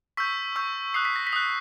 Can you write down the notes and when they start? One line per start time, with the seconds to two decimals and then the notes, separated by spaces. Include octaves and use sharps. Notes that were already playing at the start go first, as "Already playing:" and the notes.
0.17 C#6 E6 G6 B6
0.56 C#6 E6 G6
0.94 D#6 F#6 C7
1.05 B6
1.16 A#6
1.27 B6
1.33 D#6 F#6